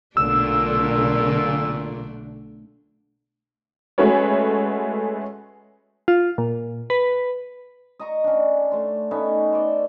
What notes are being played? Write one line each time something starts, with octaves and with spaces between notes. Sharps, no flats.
B1 A#2 D3 A3 D4 E6
G#3 A3 C#4 F#4 B4 C#5
F4
A#2
B4
D#5 A#5 C#6
C#4 D4
A3 C6
A3 B3 C#4 D#4
C5 D5